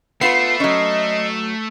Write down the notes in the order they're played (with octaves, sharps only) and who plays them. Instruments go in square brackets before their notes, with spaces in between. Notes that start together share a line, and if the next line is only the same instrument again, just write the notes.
[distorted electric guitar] A3 [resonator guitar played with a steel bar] B3 F4 B4 [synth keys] C7
[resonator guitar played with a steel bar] F#3 C#4 [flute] D#5